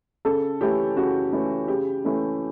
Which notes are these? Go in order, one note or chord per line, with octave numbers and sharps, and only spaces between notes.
C#3 A4
E3 A3 C#4 G4
C#3 F#4
E3 A3 C#4
C#3 G4
E3 A3 C#4